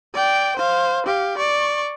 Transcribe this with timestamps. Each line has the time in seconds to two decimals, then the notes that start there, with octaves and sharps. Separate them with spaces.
0.14 D5 G5
0.57 C5 F5
1.06 G4 F5
1.38 D5 C#6